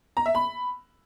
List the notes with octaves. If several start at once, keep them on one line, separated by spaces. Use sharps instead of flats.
A#5
E5
B5